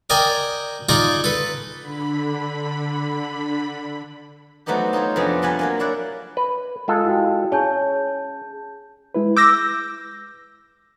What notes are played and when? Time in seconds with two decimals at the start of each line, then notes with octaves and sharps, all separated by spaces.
0.10 A#4 D5 D#5 G5 G#5
0.89 D#4 F4 G#4 D5 D#5
1.24 A4 B4
1.78 D3 B5
4.66 F#3 A3 B3 C4 D#4 G4
4.93 D#4 F4 C5 C#5
5.16 F2 C3 A3 B3 D4 G#4
5.42 C3 G3 F4 F#5 G#5 B5
5.59 F#3 A#3 G#5
5.79 E4 C#5 D5 F5 F#5
6.37 B4
6.88 G#3 F4 A4
7.05 E4 F#4 G5
7.52 C#4 G#4 A5 G6
9.15 G#3 E4 B4
9.37 D6 E6 G6 A#6